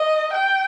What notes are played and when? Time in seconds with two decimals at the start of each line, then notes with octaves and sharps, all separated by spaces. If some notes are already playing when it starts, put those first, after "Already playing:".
Already playing: D#5
0.33 G5